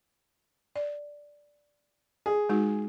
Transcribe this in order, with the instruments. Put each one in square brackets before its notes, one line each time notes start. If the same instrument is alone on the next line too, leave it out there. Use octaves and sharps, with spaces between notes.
[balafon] D5
[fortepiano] G#4
[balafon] G#3 D#4 F#4